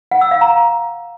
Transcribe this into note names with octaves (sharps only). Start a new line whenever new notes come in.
F#5
E6
F5
A#5